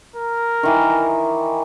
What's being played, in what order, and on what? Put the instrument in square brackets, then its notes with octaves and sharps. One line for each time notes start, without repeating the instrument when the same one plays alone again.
[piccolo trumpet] A#4
[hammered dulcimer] D#3 E3